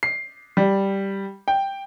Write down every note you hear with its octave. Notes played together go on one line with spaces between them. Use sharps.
C7
G3
G5